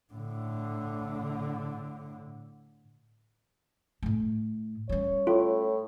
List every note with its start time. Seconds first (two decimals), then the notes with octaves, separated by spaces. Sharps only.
0.13 A2 D3
4.02 A2 A3
4.89 G3 C#4 C#5
5.27 A2 F4